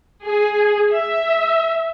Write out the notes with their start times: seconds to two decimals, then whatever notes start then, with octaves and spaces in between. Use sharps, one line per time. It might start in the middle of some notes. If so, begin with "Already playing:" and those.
0.24 G#4
0.92 E5